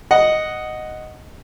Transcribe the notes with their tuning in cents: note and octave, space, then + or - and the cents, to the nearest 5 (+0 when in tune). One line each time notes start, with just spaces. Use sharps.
D#5 +0 F#5 +0